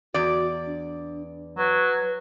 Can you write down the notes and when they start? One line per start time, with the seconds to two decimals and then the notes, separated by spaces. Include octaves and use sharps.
0.14 E2 F#4 D5
0.66 D4
1.58 F#3 B4